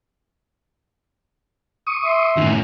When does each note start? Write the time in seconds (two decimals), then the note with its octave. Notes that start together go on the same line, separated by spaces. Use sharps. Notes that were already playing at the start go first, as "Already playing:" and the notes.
1.87 C#6 D#6
2.04 E5 C6
2.37 F#2 A2 D#3